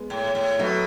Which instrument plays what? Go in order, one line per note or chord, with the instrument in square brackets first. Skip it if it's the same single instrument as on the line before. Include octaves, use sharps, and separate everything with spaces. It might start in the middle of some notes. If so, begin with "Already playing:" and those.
Already playing: [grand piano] G#3 B3
[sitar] A2
A2
[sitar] B2 [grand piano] F#3 A3